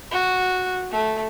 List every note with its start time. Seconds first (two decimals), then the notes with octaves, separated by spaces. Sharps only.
0.11 F#4
0.91 A3